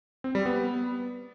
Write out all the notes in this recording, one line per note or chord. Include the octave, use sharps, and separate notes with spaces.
C4
G3
B3